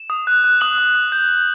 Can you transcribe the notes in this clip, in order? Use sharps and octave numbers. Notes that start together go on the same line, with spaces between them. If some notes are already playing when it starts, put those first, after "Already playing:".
Already playing: E7
D#6
F#6
F#6
D#6 F#7
D#6
D#6
G6
G6